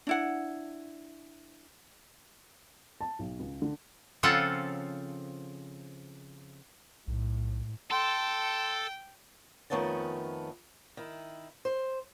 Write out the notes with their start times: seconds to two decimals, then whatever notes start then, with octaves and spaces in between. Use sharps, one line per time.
0.07 D4 E4 F#5
3.01 A5
3.19 B1
3.39 C#2
3.62 D3
4.23 C#3 F3 C4 F4 A4 F#5
7.08 B1 A2
7.91 A4 G5 C6
9.70 F2 D#3 A3 B3 C#4 A5
10.97 D#3 E4
11.65 C5